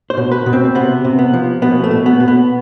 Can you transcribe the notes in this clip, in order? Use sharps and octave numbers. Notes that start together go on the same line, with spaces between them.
C5
B2
B4
B2
C4
C3 B3
C3
B3
F3
B2 B3
A3
B2
B3
B2
B3